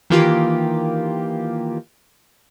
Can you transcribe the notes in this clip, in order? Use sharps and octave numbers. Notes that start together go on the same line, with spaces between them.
D#3 E3 A#3 F4 G4